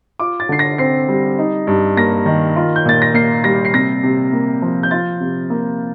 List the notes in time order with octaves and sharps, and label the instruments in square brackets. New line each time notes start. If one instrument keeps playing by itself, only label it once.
[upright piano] F4 D6
A6
D3 C7
A#6
C4 C7
G3
D#4
G2
A#3 A#6
D#3
F4
G6
A#2 A6
A#6
A#3 C7
G3 A#6
C7
C3 A#6
C3
A#3
F3
G6
F4 A6
C3
A#3